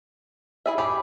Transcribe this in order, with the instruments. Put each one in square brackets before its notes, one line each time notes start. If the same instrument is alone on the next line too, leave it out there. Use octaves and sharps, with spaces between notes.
[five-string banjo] E4 G#4 E5
[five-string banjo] G4 G#4 C#5 [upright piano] B5